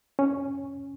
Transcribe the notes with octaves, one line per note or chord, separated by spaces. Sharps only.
C#4